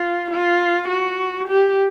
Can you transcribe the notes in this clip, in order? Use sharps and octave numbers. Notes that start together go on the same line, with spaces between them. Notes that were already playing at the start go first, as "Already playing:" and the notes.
Already playing: F4
F4
F#4
G4